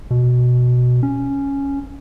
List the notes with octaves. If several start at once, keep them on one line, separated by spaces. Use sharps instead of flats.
B2
C#4